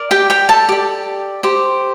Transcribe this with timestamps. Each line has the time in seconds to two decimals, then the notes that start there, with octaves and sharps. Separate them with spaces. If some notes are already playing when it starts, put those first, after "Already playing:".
Already playing: A#4 D5
0.11 G4 G5
0.30 G4 G5
0.49 A4 A5
0.69 G4 D5
1.43 G4 C5